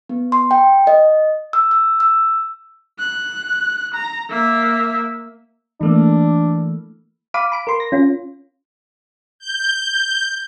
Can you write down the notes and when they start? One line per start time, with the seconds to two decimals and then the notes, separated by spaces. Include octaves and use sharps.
0.09 B3
0.32 C6
0.51 G5
0.87 D#5
1.53 E6
1.71 E6
2.00 E6
2.99 F#6
3.94 A#5
4.29 A#3 E5
5.81 E3 A3 A#3 D4
7.34 F5 B5 D6 D#7
7.52 B5 D7
7.67 A#4 C6
7.80 A#6
7.92 C#4 F4
9.39 G6